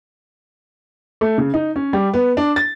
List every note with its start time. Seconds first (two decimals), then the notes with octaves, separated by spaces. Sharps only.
1.21 A3
1.38 C#3
1.54 D#4
1.76 C#4
1.93 G3
2.14 B3
2.37 D4
2.56 A6